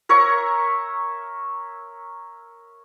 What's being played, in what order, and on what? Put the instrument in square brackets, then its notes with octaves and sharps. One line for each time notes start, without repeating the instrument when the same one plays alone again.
[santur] A#4 C#5 E5 C#6